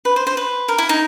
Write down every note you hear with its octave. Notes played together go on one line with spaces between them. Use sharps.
B4
C5
C5
B4
A#4
E4
D#4